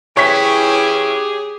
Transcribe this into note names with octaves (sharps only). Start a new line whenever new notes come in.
E3 C#4 E4 G4 G#4 C#5 B6